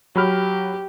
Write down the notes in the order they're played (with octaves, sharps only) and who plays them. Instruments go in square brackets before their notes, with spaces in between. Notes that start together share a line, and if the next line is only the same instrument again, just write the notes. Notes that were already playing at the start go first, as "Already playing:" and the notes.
[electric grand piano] F#3 B5 F6 [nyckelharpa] G4